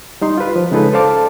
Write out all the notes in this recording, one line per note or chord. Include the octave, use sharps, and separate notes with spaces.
G3 D#4 C6
F4 B4
F3
C#3 G#3 D#4 G#4 A4 B4
A4 C5 D5 F5 A5 D6